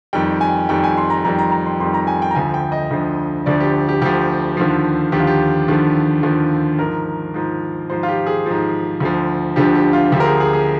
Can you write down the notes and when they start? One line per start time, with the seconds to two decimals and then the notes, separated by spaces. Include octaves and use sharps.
0.13 F2 D#3 G3 G5
0.41 G#5
0.69 F2 D#3 G3 G5
0.83 G#5
0.97 C6
1.10 A#5
1.24 F2 D#3 G3 A#5
1.39 A#5
1.52 A#5
1.66 C6
1.80 F2 D#3 G3 C6
1.94 A#5
2.07 G#5
2.22 G5
2.31 A#5
2.35 D2 D3 F3 G#5
2.54 G5
2.72 D#5
2.91 D2 D3 F3
3.46 D2 D3 F3 D5
3.60 G4
3.89 G4
4.01 D2 D3 F3 G4
4.57 D#2 D3 F3
5.12 D#2 D3 F3 G4
5.20 F4
5.27 G4
5.68 D#2 D3 F3
6.23 D#2 D3 F3
6.79 G#2 F3 A#4
7.34 G#2 F3
7.90 G#2 F3 C5
8.03 F4
8.08 G4
8.27 G#4
8.46 G#2 F3
9.00 D2 D3 F3
9.56 D2 D3 F3 G4
9.75 G4
9.93 F4
10.12 D2 D3 F3 G4
10.20 A#4
10.25 G#4
10.40 G#4
10.53 G#4